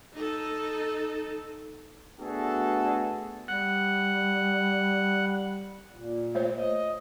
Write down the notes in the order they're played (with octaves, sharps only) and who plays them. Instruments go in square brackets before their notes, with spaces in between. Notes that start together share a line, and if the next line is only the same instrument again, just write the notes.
[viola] D#4 A4
[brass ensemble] A3 B3 D4 F#4 G#4 A4
[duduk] G3 [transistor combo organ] F#5
[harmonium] A#2
[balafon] A3 C5 C#5
[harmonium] D#5